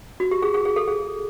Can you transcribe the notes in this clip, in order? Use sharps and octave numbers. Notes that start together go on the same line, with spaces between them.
F#4
G4
G#4
G#4
G#4
A4
G#4